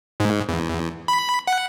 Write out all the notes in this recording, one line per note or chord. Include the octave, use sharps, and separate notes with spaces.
G#2
E2
B5
F#5